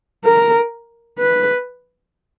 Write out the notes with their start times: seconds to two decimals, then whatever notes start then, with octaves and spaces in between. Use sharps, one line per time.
0.25 A#4
1.19 B4